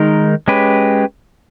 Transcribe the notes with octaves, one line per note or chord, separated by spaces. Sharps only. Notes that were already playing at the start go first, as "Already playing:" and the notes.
Already playing: D#3 G#3 D#4 A#4
G#3 C#4 G4 B4